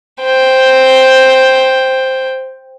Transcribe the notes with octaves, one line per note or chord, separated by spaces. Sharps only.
C5 G5